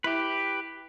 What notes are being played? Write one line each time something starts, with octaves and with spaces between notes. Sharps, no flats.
E4 G4 B4 E5